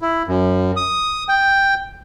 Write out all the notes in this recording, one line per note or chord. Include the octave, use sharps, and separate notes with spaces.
E4
F#2
D#6
G5